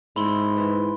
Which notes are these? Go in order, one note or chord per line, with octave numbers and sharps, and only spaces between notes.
G#2 E4 B5 C6 G7
E3